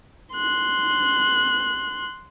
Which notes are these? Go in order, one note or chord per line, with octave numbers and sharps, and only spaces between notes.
C6 F#6